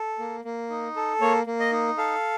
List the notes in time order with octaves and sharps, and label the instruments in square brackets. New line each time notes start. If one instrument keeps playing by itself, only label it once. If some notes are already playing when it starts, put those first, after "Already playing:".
Already playing: [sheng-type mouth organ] A4
A#3
A#3
D#4
A4
A#3 C#5
A#3
D#5
D#4
A4 F5